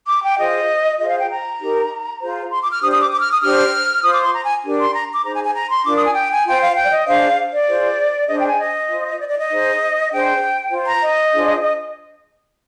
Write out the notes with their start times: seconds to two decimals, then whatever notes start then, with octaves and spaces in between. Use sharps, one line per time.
0.08 D6
0.23 G5
0.38 F4 G#4 C5 D#5
0.99 F4 G#4 C5 D#5
1.09 F5
1.19 G5
1.29 A#5
1.60 D#4 G4 A#4
2.20 F4 G#4 C5
2.51 C6
2.61 D6
2.71 F6
2.81 D4 G4 C5 D#6
2.92 D#6
3.02 D6
3.12 D6
3.21 F6
3.32 D#6
3.42 D4 G4 C5 F6
4.03 F4 C5 D#6
4.13 D6
4.23 C6
4.34 A#5
4.43 G#5
4.64 D4 G4 A#4
4.79 C6
4.94 A#5
5.14 D6
5.25 D#4 G#4 C5 A#5
5.34 G#5
5.45 G#5
5.55 A#5
5.70 C6
5.85 D4 F4 A#4 D6
5.96 D#6
6.05 G#5
6.15 G5
6.31 G#5
6.46 F4 C5 G5
6.61 F5
6.76 G5
6.84 D5
6.91 D#5
7.06 D4 G#4 C5 F5
7.52 D5
7.68 F4 G#4 C5
8.28 D4 G#4 C5 D#5
8.38 G5
8.48 G#5
8.58 D#5
8.89 F4 C5
9.19 D5
9.29 D5
9.40 D#5
9.50 D#4 G#4 C5
10.10 D4 G#4 C5 G5
10.71 F4 C5
10.87 A#5
11.02 D#5
11.32 D4 F4 G#4 C5
11.62 D#5